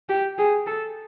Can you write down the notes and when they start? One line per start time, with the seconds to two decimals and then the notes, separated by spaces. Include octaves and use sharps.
0.09 G4
0.39 G#4
0.67 A4